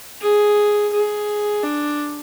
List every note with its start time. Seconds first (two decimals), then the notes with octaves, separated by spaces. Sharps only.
0.21 G#4
0.93 G#4
1.63 D4